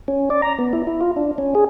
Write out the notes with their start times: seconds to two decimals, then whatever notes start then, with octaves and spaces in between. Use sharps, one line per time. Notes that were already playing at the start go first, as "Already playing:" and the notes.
0.08 C#4
0.30 D5
0.42 A#5
0.59 B3
0.73 E4
0.87 E4
1.01 F4
1.17 D4
1.38 C#4
1.55 G#4